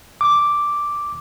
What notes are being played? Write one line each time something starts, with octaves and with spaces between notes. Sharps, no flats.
D6